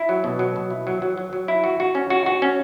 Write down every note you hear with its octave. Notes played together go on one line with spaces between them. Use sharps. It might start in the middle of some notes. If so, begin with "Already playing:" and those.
Already playing: E4
F#3
B2
F#3
B2
E4
F#3
F#3
F#3
F#3
E4
F#4
F#4
C#4
F#4
F#4
C#4